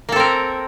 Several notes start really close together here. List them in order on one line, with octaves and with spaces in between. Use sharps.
A#3 A4 C4 A#4